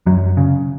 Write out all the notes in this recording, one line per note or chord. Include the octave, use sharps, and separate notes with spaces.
F#2 F#3
C#3